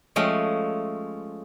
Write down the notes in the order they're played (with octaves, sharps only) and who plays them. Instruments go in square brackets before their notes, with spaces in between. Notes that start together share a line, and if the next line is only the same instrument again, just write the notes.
[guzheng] F3 G#3 A3 C#4